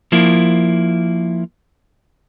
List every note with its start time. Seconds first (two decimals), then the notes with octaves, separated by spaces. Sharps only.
0.12 F3 A#3 E4